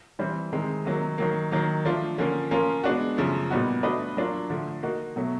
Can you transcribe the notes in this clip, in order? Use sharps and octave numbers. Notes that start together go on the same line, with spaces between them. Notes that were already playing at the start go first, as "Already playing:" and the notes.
E3 G3 C4
C3 D#3 G#3 C4
C3 D#3 F#3 A#3
D#3 F#3 A#3
D#3 F#3 A#3
F3 A3 D4 F4
D3 F3 A#3 C#4
F3 A#3 C#4 F4 A#4
G#3 B3 D4 F#4
F#2 C#3 F3 A3
A#2 G3 B3 D#4 F#4
A3 D4 F#4 B4 D#5
F#3 A#3 D4 F4
D3 F3 A3
A#3 D#4 F#4
B2 F#3 A3